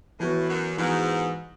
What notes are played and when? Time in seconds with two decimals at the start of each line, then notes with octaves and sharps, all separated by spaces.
0.19 A2 E3 B3 F#4
0.48 F#2
0.77 G#2 E3 B3 F#4